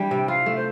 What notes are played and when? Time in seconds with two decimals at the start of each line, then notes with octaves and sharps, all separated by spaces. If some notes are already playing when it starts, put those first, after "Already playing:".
Already playing: E3 G3 D4 G5
0.11 C3
0.28 F4 F5
0.46 A3
0.56 C5